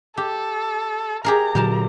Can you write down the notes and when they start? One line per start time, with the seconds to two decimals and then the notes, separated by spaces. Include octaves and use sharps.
0.17 G4 A4
1.24 G4 G#4 A#4 A#5
1.55 A#2 D3 F#3 G4 A#4 A5